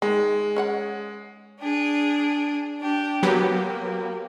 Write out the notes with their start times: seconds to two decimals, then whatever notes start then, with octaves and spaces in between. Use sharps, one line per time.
0.02 D#3 G#3 G#4
0.56 C#4 C#5 F#5
1.58 D4 G#4
2.79 D4 G4
3.23 F#3 A#3 B3 G4